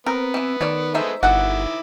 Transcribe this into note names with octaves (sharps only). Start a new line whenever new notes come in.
B3 C4 A#4
E3 E4
D#3 A3 C#5 D5
G#3 A3 B3 D#4 C5 E5
G1 D#3 E4 F#4 A4 F#5 D6